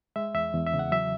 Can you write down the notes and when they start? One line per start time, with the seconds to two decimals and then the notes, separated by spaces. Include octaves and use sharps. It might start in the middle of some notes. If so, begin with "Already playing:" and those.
0.16 G#3 E5
0.34 E2 E5
0.54 E2
0.67 E5
0.73 C#3
0.79 F#5
0.92 F#3 E5